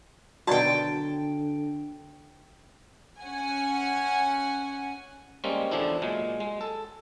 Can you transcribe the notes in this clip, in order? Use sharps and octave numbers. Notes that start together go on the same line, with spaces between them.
B2 D3 D#3 F#3 F#4 D5 G5 A5
C#4 F#5 G#5
G3 G#3 A#3 C4 C#4
E2 D3 F3 D4 E4
A#2 F#3 G#3
G#3
A4